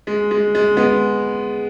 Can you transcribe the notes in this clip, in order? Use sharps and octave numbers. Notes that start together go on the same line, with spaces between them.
G#3
G#3
G#3
G#3 B3